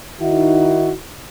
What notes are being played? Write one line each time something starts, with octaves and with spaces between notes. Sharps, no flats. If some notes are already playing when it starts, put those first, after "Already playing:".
D#3 D#4 E4 F#4